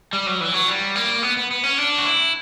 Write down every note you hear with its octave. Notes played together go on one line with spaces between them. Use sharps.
G3
F#3
E3
F#3
G3
A#3
B3
B3
B3
C#4
D4
F#4
E4